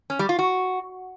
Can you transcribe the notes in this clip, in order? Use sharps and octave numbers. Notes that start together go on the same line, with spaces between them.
C#4
G3
F4
F#4